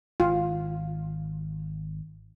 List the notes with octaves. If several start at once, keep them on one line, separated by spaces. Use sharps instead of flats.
G#1 F4